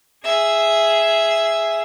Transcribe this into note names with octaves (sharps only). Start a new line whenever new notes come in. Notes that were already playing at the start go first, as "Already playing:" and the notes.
G#4 E5